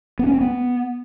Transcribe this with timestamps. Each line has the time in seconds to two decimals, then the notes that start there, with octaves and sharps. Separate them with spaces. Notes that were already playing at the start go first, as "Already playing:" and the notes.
0.19 B3
0.26 C#4
0.34 C4
0.41 B3